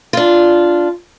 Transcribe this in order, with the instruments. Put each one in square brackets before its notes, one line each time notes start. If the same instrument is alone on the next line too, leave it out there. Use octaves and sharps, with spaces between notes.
[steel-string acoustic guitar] D4 F4